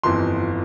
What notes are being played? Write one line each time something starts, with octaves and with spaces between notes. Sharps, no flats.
G1 F2 E3 C6